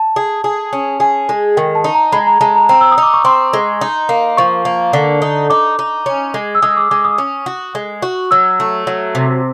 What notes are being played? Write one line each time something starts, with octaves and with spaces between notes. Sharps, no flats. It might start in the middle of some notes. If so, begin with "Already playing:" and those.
Already playing: A5
G#4
G#4
C#4
G#4 G#5
G#3
D#3 G5
A5
D#4
A#5
G#3 B5
A#5
G#3 A5
A#5
C4 A#5
E6
D#6
D#4
D6
C#6
C4 C6
G#3
D#4
A#3
F3 C#6
A#3
D3
D#4
D#4 D6
D#4
C#4
G#3
E6
G#3 D#6
D6
G#3 D6
D#6
C#4
F#4
G#3
F#4
F#3 E6
A3
F#3
C3